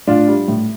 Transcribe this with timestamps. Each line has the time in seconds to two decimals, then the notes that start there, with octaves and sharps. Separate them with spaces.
0.07 A2 D4 F4
0.27 G3
0.48 A2